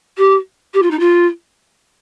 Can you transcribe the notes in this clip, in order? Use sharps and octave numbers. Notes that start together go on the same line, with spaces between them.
G4
G4
F4
D#4
F4